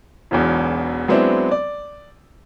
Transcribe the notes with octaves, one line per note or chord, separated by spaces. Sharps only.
E1 B1 E2
F#3 G#3 B3 C4 D4 E4
D5